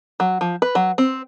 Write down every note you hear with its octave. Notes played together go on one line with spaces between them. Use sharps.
F#3
F3
B4
F#3
C4